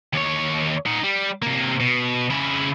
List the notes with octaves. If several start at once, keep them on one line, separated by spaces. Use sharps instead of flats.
D#2 C#5
D#4 F#5
G3
C3 A#3
B2
C#3 E4